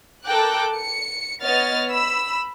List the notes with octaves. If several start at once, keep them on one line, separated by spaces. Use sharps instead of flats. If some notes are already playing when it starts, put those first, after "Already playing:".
A4 A#4 G5 D6 F#6
C#7
B3 C#5 D#5 F6 A6
B5 E6